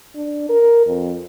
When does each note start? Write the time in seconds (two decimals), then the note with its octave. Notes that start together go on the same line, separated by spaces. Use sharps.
0.15 D4
0.49 A#4
0.87 F2